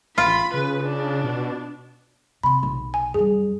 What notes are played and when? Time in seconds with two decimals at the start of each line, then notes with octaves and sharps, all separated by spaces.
0.18 A1 F4 B5
0.54 C#3 B4
0.84 D4
1.24 B2
2.43 C3 B5 C6
2.63 B1
2.94 G#5
3.14 F#2 G3 G#4